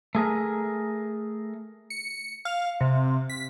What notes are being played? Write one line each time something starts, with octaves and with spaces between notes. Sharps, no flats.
A3 G#4 A#4
C#7
F5
C3
B6